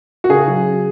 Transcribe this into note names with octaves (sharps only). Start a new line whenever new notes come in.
F#4
C#3 G#4
F#3